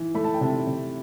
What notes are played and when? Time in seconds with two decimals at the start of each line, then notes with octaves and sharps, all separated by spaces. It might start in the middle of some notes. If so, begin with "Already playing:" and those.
Already playing: E3
0.15 A3 B5
0.24 A5
0.34 G5
0.41 C3 A5
0.67 C3